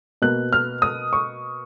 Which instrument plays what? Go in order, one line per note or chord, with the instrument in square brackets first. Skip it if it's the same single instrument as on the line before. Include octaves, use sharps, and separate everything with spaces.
[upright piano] B2 A#3 F#6
F6
D#6
C#6